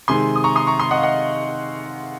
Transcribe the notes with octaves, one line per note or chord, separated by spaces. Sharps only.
C3 D#3 G#3 G#5 C6
D#6
A#5 C#6
C6 D#6
A#5 C#6
C6 D#6
D#5 F#5
F5
D#5 F#5